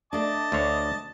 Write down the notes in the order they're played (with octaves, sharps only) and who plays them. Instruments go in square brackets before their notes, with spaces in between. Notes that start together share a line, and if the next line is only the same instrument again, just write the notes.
[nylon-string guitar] A3 D4 [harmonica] D#5 A5 D6
[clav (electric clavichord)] D2 D3 C#5